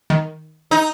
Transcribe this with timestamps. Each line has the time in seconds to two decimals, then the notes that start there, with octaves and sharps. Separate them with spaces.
0.10 D#3
0.71 D#4